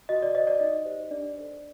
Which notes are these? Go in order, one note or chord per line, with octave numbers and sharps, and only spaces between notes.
F#4 D#5
D5
C5 D#5
D5
D#4 D#5
G4 C5
D4 D5
A4 C5